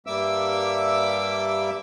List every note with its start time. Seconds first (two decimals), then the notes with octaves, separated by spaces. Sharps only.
0.07 G2 G3 A#3 E5 D6 E6